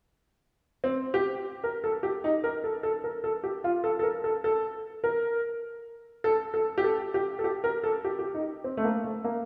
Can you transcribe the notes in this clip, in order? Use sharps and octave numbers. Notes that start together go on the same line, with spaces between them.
C4
G4
A#4
A4
G4
D#4
A#4
A4
A4
A#4
A4
G4
F4
A4
A4
A#4
A4
A4
A#4
A4
A4
G4
A4
G4
A4
G4
A#4
A4
G4
G4
D#4
C4
A3
A#3
A3
A#3